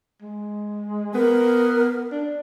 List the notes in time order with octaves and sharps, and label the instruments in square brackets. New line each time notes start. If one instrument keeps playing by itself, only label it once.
[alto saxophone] G#3
[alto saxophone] B3 [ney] A#4
[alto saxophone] D4